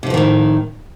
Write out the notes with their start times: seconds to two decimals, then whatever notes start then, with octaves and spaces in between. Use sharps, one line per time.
0.03 C3
0.07 F2
0.10 F3
0.14 D#3
0.17 A2